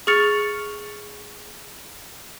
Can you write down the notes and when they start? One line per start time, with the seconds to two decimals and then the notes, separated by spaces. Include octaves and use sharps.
0.07 G#4 C#6 F6 A6 C#7 F7